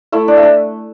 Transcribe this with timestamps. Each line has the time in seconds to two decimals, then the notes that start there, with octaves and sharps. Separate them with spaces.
0.12 A3 E4 E5
0.28 D4 D5
0.37 E5
0.43 D4